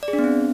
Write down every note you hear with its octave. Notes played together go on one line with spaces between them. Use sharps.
D5
G#4
D4
B3
C4